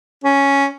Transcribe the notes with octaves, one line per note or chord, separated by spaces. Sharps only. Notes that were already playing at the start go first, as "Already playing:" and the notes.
C#4